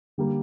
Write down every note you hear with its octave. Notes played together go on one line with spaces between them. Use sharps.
D3 G3 A#3